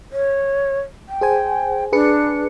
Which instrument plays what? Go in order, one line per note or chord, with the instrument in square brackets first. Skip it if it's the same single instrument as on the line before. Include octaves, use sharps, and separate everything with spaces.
[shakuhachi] C#5
G5
[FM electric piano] G#4 C5 G#5
[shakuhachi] D4 [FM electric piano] G#4 B4 C#7